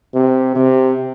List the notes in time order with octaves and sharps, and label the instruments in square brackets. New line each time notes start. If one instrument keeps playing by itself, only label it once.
[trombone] C3
C3